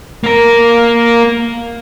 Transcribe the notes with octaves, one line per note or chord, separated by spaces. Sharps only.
A#3 A#4